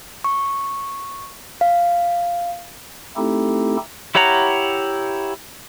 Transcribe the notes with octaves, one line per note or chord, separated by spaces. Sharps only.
C#6
F5
A3 C4 D#4 E4 G4 A4
E4 G4 C#5 F#5 A#5